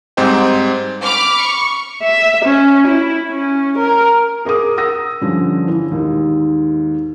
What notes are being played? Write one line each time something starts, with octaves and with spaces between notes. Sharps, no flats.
G#2 G3 C4 D#4 G5
B5 D6 F6
C#6
E5
C#4
E4
C#4
A#4
G#4 A#4 D6 D#6
D#6 E6 A#6
G2 D3 F3 C#4
E3
D#2 G#2